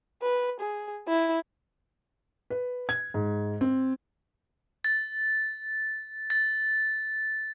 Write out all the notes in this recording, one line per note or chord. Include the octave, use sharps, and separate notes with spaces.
B4
G#4
E4
B4
G#6
G#2
C4
A6
A6